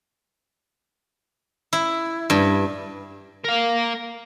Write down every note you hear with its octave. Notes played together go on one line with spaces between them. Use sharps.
E4
G2
A#4 F5